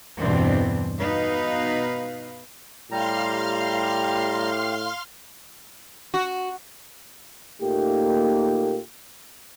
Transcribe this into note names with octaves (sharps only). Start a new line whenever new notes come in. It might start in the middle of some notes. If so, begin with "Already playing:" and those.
E2 G2 B2 E3 C4 D4
B2 D#4 B4 F5
A2 G3 G4 F5 A#5 C6 F6
F#4
A#2 A3 A#3 D#4 G4